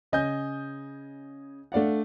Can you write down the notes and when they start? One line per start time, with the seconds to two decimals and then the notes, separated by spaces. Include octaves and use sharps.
0.12 C#3 D#5 G#5 G6
1.72 A3 D4 D5 F5 F#5